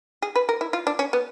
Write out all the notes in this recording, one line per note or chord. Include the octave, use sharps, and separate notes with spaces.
G#4
B4
A#4
E4
F4
D4
C#4
B3